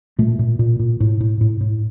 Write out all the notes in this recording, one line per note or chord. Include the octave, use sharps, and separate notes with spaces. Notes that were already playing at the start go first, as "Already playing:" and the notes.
A#2 A3
A#2
A#2
A#2
A2
A2
A2
A2